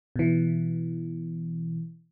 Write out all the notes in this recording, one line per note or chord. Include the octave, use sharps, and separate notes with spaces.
B2 E3